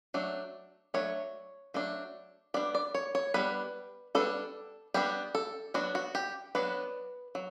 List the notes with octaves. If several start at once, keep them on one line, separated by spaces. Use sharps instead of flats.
F#3 A3 D4
F#3 A3 D4 C#5
F#3 A3 D4
G3 B3 D4 D5
D5
C#5
C#5
G3 B3 D4 B4
G3 B3 D4 A4
G3 B3 D4 G4
A4
F#3 B3 D4 F#4
F#4
G4
F#3 B3 D4 B4
F#3